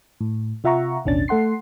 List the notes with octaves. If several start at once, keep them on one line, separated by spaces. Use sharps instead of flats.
A2
C3 F4 E5 F#5 A#5 C#6
A1 D#2 B2 C#4 D4 A6
A3 A4 F#5 C6 C7